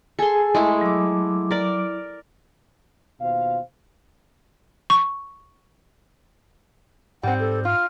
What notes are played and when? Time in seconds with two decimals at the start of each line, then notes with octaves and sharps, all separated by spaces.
0.19 G#4 A4 G#5 C6
0.55 G#3 A3 E4
0.81 F#3 D6
1.51 A#4 D5
3.21 D#2 B2 F4 C5 F5
4.90 C#6
7.23 G#2 G3 C4 F#5
7.40 A4
7.65 F4 F6